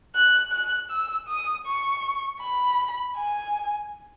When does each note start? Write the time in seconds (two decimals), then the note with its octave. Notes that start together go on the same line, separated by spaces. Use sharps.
0.15 F#6
0.53 F#6
0.91 E6
1.29 D#6
1.67 C#6
2.41 B5
3.17 G#5